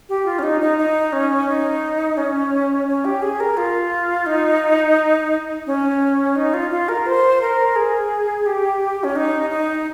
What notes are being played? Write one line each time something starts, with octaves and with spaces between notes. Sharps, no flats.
G4
F4
C#4
D#4
D#4
D#4
C#4
D#4
C#4
C#4
G4
G#4
A#4
F4
D#4
C#4
D#4
F4
F4
A#4
C5
A#4
G#4
G4
C#4
D#4
D#4